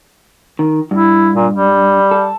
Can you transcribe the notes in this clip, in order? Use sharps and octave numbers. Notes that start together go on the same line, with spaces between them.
D#3
G2 E4
A#2
G3
A4